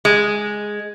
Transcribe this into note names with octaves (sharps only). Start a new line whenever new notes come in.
G#3